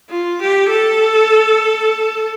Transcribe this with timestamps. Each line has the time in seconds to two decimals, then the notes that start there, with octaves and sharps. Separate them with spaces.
0.10 F4
0.41 G4
0.70 A4